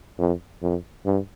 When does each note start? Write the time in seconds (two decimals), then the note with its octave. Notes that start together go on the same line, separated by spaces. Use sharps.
0.19 F2
0.62 F2
1.05 G2